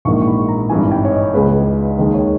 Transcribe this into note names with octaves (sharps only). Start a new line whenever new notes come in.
A#1 G#2 E3 A#3 C#6
C#6
B5
A#5
G#1 G2 E3 G#5
G5
C#5
D#5
C#2 C#3 G#3 B4
D#2 D#3 G#3
C#5